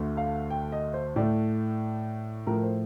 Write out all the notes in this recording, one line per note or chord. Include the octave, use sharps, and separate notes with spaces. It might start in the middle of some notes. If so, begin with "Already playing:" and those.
Already playing: D2 D3 A3
F5
G5
D#5
C5
A2 A3 D5
A2 F3 A3 A#4
A#4
C5